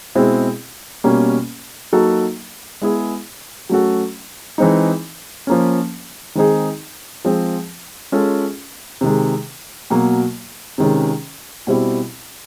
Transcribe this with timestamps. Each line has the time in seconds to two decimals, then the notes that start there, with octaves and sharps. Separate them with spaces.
0.15 B2 G#3 C4 E4
1.04 B2 G3 A#3 C#4
1.93 F#3 A#3 D#4 F#4 A4
2.82 G#3 B3 E4 G#4
3.69 F#3 A3 C#4 F#4 A4
4.58 E3 G#3 C4 D#4
5.47 F3 A#3 C#4
6.35 D#3 G#3 C4 D#4 G#4
7.25 F3 G#3 C4
8.12 G#3 C#4 F4 A4
9.01 C3 D#3 G#3
9.90 B2 F#3 A#3
10.78 C3 D#3 G#3 C#4
11.67 B2 G3 C4 E4 G4